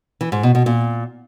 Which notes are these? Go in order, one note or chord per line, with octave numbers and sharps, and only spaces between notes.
E3
G#2
B2
B2
A#2